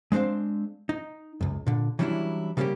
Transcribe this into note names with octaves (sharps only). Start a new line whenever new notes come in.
G#3 C4 D4 C5 F5
D#4
C#2 F#2
A#2 D3
E3 F#3 G3 C#4 D4 E4
C#3 G3 A#3 B3 C#4 G4